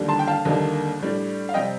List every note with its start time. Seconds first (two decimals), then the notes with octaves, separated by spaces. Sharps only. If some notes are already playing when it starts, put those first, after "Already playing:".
Already playing: D#2 D3 G3
0.08 A5 C6
0.19 G5
0.28 F5 A5
0.45 D#2 D3 G3 A#3 D#4
1.00 A2 G3 D4
1.49 F5
1.54 C3 G3 C4 D#5 G5